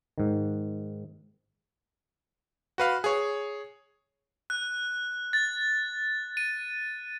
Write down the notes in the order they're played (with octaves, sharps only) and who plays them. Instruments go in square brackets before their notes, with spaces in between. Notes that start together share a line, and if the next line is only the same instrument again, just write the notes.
[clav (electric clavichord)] G#2 D#3
[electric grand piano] F#4 B4 F5
G#4 C#5
[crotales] F#6
A6
D#7